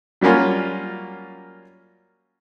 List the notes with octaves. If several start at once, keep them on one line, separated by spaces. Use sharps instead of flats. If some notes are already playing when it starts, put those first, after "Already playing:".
F#3 G3 A#3 C#4 F4